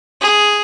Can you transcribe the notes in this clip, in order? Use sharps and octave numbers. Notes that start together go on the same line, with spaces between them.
G#4